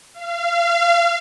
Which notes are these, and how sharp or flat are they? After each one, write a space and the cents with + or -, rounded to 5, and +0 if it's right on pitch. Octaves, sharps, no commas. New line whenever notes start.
F5 -30